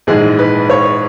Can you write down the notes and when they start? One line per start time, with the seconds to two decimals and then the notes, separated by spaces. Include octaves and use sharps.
0.07 A#1 G#2 E3 G#3 G#4
0.39 B4
0.70 C#5